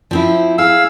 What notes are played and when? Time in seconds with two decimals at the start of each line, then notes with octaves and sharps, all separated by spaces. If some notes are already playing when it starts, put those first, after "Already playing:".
0.11 F3 C4 E4
0.58 G#4 F5 E6